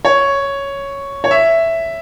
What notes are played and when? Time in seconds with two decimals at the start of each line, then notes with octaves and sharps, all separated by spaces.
0.05 C#5
1.24 C#5
1.31 E5